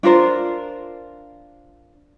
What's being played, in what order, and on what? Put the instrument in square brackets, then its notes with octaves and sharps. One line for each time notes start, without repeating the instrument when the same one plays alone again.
[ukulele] D4 F4 A#4 C5